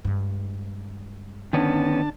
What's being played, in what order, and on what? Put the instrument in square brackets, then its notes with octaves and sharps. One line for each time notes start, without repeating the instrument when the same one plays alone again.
[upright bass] G2 G#3
[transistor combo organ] D3 D4 A5 [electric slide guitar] D#3 B3 C#4